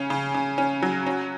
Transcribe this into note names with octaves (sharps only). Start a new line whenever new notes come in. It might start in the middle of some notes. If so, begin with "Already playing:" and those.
Already playing: C#3 C#4
C#3
C#3
C#4
F#3
C#4